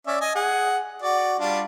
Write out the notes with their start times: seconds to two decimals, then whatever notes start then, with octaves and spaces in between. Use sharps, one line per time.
0.07 C#4 D5 E5
0.21 D#5 G#5
0.35 G#4 F#5
1.02 F#4 D5
1.39 G3 D4 F4